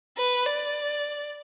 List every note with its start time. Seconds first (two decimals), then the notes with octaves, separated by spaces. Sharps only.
0.18 B4
0.46 D5